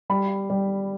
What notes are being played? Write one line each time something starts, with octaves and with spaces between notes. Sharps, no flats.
G3 B5
G3